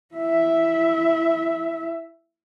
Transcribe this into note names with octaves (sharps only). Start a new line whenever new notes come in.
E4 E5